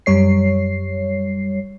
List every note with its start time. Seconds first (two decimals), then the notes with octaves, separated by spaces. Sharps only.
0.06 F#2 G3 C#5 C7